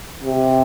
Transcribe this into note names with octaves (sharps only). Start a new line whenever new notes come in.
C3